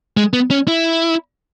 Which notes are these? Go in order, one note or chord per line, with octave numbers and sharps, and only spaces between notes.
G#3
B3
C#4
E4